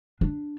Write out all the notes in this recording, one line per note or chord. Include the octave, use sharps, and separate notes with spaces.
D4